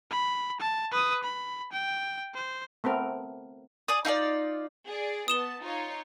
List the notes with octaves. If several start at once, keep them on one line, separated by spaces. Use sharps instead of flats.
B5
A5
B4 D#6
B5
G5
C5
A3 B3 C4 A#4
G#4 D5 D#6
D#4 F4 A4 D5
G#4 D5
B3 A5 D#6 E7 G7
D#4 F4 C#5